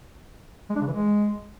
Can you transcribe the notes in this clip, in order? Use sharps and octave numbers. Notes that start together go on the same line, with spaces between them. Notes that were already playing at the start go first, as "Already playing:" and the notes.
G#3
D4
C#3
E3
G#3